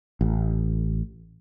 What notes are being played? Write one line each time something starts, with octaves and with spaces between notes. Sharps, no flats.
A1